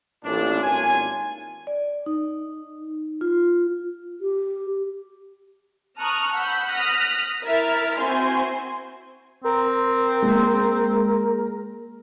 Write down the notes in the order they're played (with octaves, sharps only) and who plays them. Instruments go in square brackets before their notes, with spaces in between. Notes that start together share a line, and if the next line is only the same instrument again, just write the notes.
[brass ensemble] A1 A#2 D4
G#1 D#2 D#3 F4 C#5 G#5
[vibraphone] D5
D#4
F4
[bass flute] G4
[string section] A5 A#5 C#6 D#6 F6 F#6
F#5 B5 E6 F#6 G6
D#6 F6 F#6 A#6 B6
E4 A#4 E5 F6 A6
C4 E4 F#4 C5 G#5 C6
[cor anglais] C4 [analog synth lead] A#4
[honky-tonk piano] G#3 A#3